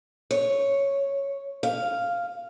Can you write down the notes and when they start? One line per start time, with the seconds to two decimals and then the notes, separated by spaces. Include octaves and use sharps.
0.31 C#5
1.63 F5